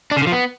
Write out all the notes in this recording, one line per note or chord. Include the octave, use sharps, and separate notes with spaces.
D4
C#3
D3
F3
B3